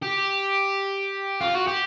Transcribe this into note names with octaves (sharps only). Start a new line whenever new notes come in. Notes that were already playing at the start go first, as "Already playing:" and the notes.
G4
F4
F#4
G4